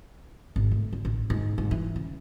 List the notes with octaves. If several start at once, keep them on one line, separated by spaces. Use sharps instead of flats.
G#1
A2
D3
A1
G#2
G#2
E3
C#3